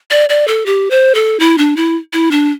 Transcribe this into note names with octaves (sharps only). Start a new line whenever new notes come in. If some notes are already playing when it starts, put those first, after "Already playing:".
D5
D5
A4
G4
C5
A4
E4
D4
E4
E4
D4